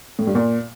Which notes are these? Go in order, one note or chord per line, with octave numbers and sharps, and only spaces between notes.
A2
G2
A#2